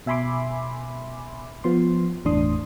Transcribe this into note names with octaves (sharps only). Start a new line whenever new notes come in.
B2 E5 G#5 B5 C6 D6
F3 B3 C6
G1 E2 A2 D4 C6 D#6